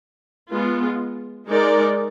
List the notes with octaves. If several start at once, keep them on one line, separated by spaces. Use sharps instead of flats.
G#3 B3 F4
G#3 D#4 A#4 D5